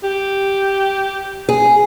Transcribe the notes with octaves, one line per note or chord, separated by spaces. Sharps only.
G4
G#4